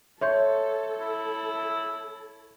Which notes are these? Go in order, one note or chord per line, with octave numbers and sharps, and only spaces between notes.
A4 C#5 E5 C6 G6
E4